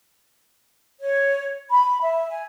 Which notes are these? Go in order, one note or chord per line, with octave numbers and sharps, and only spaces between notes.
C#5
B5
E5
G#5